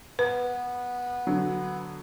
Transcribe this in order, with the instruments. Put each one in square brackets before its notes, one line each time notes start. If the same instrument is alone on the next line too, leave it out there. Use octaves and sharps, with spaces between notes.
[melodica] B3 [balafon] B4
[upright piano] D3 F#3